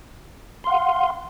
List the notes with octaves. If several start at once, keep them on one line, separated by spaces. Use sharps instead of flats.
F5 F#5 C6